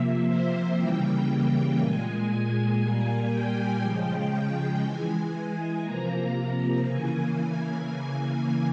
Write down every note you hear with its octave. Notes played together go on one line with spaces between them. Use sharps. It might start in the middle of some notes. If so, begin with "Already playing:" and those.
Already playing: C3 F3 A#3 E5
C5
C#3 E3 G3 A#3 G5
A#2 G#3 G#5
G#5
A#2 G3 A#3
G5
C#3 F3 G#3 G5
E3 G#3 G#5
C3 F3 A#3 A#5
C#3 E3 A#3 G#5